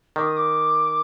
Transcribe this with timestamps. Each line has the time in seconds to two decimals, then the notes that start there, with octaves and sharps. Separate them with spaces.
0.16 D#3 D6
0.27 D#6
0.37 D6